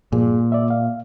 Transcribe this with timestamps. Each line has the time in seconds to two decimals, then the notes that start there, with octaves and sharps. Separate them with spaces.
0.12 G2 A#2 F3 G#4
0.52 D5 E5
0.70 F5